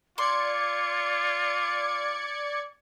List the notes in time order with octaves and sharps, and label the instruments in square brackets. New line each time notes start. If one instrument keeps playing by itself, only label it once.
[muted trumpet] F4 [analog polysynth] D5 G#6 C#7 [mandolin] C6 [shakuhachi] D6